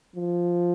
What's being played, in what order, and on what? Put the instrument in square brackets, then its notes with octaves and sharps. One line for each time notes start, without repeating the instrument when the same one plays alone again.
[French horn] F3